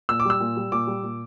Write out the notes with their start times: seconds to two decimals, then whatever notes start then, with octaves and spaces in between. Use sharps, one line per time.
0.09 A#2 E6
0.20 D6
0.25 G3 E6
0.40 A#2
0.56 G3
0.72 A#2 D6
0.87 G3
1.03 A#2